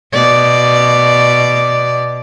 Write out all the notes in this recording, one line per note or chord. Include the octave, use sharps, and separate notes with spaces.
B2 D5